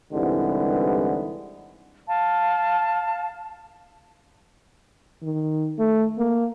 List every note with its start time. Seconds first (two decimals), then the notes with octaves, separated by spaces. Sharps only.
0.12 C2 G#2 D3 E3 G3 B3
2.08 F5 A5
5.22 D#3
5.79 A3
6.18 A#3